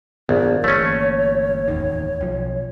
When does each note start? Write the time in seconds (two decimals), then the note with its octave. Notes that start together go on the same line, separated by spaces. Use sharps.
0.29 A#1 G2 D#3 B3
0.64 G1 E3 A3 A#3 C#4 C#5
1.68 D1 E2 D#3
2.21 B1 F3